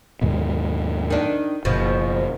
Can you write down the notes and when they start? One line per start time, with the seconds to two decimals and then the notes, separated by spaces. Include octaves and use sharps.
0.22 D#2 G#2 B2
1.10 D#3 D4
1.65 F#1 B2 F3